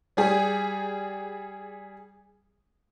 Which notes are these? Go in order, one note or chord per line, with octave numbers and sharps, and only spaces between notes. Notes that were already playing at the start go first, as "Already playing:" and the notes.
G3 G#4